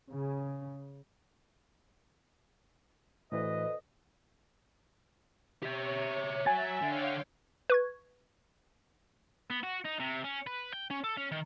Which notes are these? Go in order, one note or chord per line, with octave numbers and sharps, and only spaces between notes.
C#3
D2 A2 E3 B4 D#5
G4 C#5 E5
F#3 E5 G#5 A6
D3 C#5 F5 G5
B4 C#6 G#6
B3
F#4
D#4
C3
C#4
B4
G5
C#4
A4
C#4
D#3